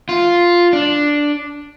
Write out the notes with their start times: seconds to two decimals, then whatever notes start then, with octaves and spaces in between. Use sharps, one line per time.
0.09 F4
0.73 D4